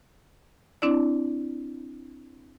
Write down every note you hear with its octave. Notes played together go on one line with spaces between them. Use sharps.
C4 D4 E4 D5